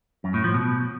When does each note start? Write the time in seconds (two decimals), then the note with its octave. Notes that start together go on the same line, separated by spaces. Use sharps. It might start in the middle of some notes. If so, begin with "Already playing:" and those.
0.24 F#2
0.34 A2
0.44 F3
0.54 B2